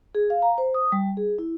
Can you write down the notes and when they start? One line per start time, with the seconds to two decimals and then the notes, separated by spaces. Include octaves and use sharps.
0.15 G#4
0.30 F5
0.42 A#5
0.58 C5
0.74 D#6
0.92 G3
1.17 G#4
1.38 E4